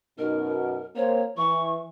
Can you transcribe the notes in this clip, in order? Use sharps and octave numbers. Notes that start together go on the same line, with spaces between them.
F#2 B2 D#4 A#4
A#3 C4 C5 C#5
E3 C#6